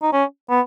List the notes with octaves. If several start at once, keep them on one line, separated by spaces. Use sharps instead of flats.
D#4
C#4
B3